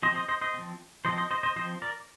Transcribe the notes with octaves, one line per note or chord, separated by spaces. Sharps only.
F3 C4 C5 D#5
C5 D#5
C5 D#5
C5 D#5
F3 C4
F3 C4 C5 D#5
C5 D#5
C5 D#5
C5 D#5
F3 C4 C5 D#5
A#4 D5